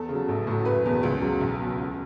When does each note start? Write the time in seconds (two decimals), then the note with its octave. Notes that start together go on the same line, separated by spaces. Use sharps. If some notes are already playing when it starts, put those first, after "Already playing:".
Already playing: E2 A4
0.09 C#3 F#3
0.28 A1
0.47 A2 F#3
0.65 F#1 B4
0.84 E2 B2
1.03 C#2
1.22 C#3 F#3
1.41 B1
1.59 B2 F#3
1.78 C#2